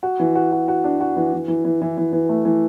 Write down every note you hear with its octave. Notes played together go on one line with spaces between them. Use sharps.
F#4
E3
F#4
F#4
F#4
D4
F#4
E3
E3
E3
E3
E3
E3
E3
A3
E3